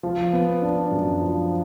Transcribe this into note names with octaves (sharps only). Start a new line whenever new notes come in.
F3
B3
D4
F#2
F3